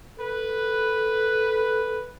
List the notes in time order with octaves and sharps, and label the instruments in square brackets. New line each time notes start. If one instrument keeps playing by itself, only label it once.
[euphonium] A4 [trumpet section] B4